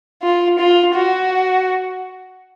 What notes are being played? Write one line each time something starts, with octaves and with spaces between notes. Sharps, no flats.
F4
F4
F#4